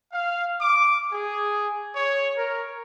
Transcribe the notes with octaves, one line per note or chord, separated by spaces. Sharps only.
F5
D6
G#4
C#5
A#4